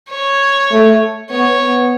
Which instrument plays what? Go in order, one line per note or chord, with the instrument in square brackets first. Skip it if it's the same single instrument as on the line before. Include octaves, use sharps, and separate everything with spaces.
[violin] C#5
[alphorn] A3
[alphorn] B3 [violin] C#5
[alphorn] B3